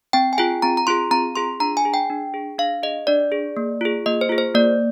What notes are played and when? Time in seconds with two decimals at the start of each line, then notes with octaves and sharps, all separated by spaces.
0.13 C4 G5
0.33 G#5
0.38 F4 G#4 G5
0.62 C4 A#5
0.77 A#5
0.87 F4 G#4 C6
1.11 C4 A#5
1.36 F4 G#4 C6
1.60 D4 A#5
1.77 G#5
1.85 G#4
1.94 G5
2.10 D4
2.34 G#4
2.58 D4 F5
2.83 G#4 D#5
3.07 D4 D5
3.32 G#4
3.57 A#3
3.81 F4 G#4
4.06 A#3 D#5
4.21 C5
4.29 F4 G#4
4.38 C5
4.55 A#3 D5